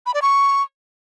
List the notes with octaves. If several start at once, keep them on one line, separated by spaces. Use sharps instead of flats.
B5
D5
C#6